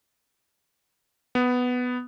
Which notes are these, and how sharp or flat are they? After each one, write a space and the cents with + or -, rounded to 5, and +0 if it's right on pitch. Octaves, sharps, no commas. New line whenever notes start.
B3 +5